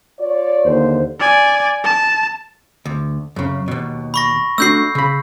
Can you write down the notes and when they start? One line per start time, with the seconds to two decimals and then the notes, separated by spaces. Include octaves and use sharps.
0.19 F4 C#5 D5
0.63 D#2 D3 C5
1.20 D5 G#5
1.84 A5
2.85 D2
3.36 F#2 C#3
3.68 D#2 B2
4.14 B5 C#6 A#6
4.58 A3 D4 F#4 E6 G6 C7
4.95 C#3 B5